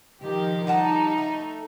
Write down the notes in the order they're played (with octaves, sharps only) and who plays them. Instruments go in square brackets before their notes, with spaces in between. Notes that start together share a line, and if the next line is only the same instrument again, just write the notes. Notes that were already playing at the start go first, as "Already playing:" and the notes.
[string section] D#3 F3 G4
[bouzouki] G3 F#5 A5 [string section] D#4
[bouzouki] A3